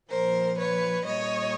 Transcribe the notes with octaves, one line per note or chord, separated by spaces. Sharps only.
A#2 F3 A#4 C5
B4 C#5
A#2 G3 C#5 D#5